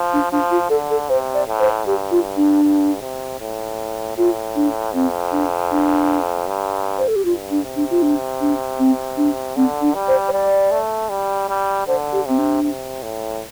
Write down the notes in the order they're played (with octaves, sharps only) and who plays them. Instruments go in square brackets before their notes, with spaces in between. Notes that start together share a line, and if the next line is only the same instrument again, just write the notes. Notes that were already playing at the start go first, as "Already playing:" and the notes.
Already playing: [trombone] F3
[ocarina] D4
[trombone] F3 [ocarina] D4
[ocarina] F4
[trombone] D3 [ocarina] A4
[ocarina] A4
[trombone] C3 [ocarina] C5
[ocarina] D5
[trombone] A2
[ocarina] C5
[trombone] G2 [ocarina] G4
[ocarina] F4
D4
[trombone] G2
C3
A2
[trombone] A2 [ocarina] F4
[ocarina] D4
[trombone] F2 [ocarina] C4
[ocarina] D4
D4
[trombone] G2
[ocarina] C5
A4
G4
[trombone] G2 [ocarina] F4
[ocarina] D4
[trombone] C3
[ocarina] D4
F4
D4
D4
C4
D4
[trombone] D3 [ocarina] C4
[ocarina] D4
[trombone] G3
[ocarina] C5
C5
[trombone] G3 [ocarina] D5
[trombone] A3
G3
G3
[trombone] D3 [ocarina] C5
[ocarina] G4
[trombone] C3 [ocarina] C4
[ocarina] D4
[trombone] C3
A2